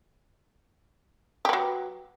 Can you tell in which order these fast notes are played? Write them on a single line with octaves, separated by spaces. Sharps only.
G4 B3 F#3